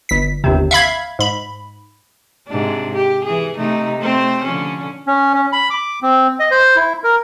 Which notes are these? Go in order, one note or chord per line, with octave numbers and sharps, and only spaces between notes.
G1 B6
G1 D#2 C3
E5 F5 B5 G#6
G#2 B5
G#2 C3 D4
G4
E3 G#4
C3 A3 D#4
A3 C4 C5
D3 F3 C#4
C#4
C#4
B5
D6
C4
D#5
C5
E4
A#4